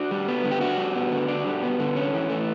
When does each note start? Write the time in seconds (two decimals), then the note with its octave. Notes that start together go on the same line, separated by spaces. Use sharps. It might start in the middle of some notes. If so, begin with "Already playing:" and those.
Already playing: D4 F#4
0.11 G3
0.28 B3
0.45 D3
0.51 G4
0.61 D4 F#4
0.78 G3
0.96 B3
1.11 D3
1.28 D4
1.46 G3
1.63 B3
1.80 D3
1.96 C#4
2.14 E3
2.30 A3